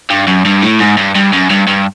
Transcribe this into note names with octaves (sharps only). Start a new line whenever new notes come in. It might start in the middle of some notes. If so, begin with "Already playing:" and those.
G2
F#2
G2
A2
G#2
G2
G2
F#2
G2
G2